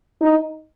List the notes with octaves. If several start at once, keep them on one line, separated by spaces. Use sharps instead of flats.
D#4